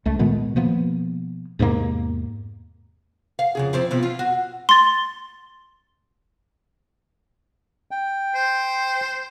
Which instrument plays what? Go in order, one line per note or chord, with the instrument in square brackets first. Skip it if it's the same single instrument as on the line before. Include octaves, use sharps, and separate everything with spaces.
[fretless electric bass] C#2 A3
A#2 D#3 G#3 B3
B2 F3 A#3 B3
E2 G#2 C3 A#3
[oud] F5
F2 C#3 G#4
F3 C4 E4
B2 F3 E4
F4
F#4
[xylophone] C6 A6
[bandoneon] G5
[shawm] C5